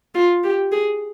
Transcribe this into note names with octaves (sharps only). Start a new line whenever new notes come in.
F4
G4
G#4